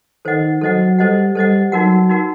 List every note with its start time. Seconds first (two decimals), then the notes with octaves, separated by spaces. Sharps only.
0.25 D#3 A4 C5 D#5 F#5
0.61 F#3 A4 C5 D#5 F#5
0.98 G3 A4 C5 D#5 F#5
1.35 G3 A4 C5 D#5 F#5
1.72 F#3 D#4 F#4 A#4 F#5
2.09 D#4 F#4 A#4 F#5